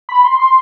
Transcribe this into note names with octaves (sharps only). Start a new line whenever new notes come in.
B5
C6
C6